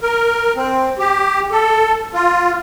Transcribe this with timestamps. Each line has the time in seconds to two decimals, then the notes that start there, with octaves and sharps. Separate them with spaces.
0.01 A#4
0.56 C4
0.99 G4
1.51 A4
2.14 F4